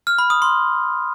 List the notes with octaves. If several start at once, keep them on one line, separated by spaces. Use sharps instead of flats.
F6
B5
D#6
C6